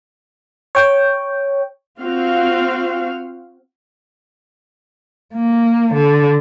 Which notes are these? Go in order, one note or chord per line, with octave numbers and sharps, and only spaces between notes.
C#5 G5
C4 F4 F#4 F5
A#3
D3